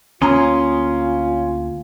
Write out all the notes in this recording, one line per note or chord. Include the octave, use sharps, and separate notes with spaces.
D2 A#3 C#4 F4 G#5 A#5 C6 D#6